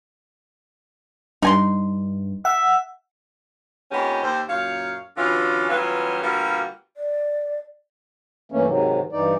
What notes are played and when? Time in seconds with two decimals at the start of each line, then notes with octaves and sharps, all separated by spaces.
1.42 G2 D#4 G#5 C6
2.45 E5 F#5
3.91 F2 A#3 B3 C#4 D#4 G4
4.23 D#2 C5
4.49 F#2 A#2 C#5 F5
5.17 B2 D3 E3 C#4 F4
5.68 E3 F#3 G3 B3 C#4 F4
6.22 B2 D3 G3 A#3 F4 F#4
6.97 D5
8.52 G2 E3 A3 A#3 C#4
8.66 G#2 C3 D#3 F#3
9.12 G2 E3 D#4 D5